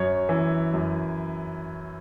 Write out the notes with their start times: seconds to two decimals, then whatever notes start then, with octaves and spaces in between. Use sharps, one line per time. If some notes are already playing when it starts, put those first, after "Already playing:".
Already playing: F#2 C#5
0.29 E3
0.74 F#2